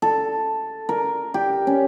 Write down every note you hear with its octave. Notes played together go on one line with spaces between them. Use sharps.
A4
A#4
G4
C#4